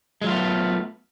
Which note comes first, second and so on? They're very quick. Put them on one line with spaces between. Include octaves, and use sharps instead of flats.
G#3 F#3 F4 A3 B3